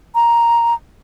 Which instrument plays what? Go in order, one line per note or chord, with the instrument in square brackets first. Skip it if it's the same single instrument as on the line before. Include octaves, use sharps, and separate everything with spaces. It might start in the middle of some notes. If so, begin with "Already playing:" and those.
[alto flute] A#5